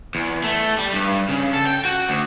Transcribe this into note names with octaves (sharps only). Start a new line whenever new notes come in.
E2
A3
G3
G2
C#3
A4
G5
F#4
D2